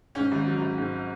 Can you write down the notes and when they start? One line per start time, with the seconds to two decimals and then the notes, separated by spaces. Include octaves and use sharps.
0.15 G#2 C#4
0.32 G#1
0.47 F#3
0.61 G#1
0.78 G#2